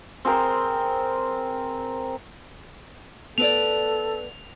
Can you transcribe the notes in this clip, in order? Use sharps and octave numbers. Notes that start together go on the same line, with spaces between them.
C4 G#4 A#4 C5
B3 A4 B4 D5 F7